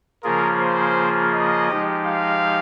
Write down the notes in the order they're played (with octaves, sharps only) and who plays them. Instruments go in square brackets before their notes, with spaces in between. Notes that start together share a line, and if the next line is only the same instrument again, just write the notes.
[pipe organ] C#3 F3 A#3 F4 G#4 [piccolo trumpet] A#4
[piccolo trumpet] C5
D#5
[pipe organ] F3 G#3 D#4 G4
[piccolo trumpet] F5